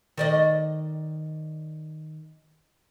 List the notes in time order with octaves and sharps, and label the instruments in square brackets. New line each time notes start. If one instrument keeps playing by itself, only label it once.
[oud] D#3 D5 D#5